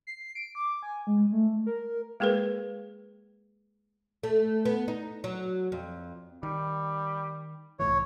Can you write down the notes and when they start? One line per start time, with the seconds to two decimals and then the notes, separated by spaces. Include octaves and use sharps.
0.07 C7
0.35 D7
0.55 D6
0.83 G#5
1.07 G#3
1.32 A3
1.66 A#4
2.20 G#3 A#3 G#4 A#4 B4
4.23 A3
4.65 B3
4.88 D#4
5.24 F#3
5.72 F2
6.43 D#3 G3
7.79 C2 A2 E3 C#5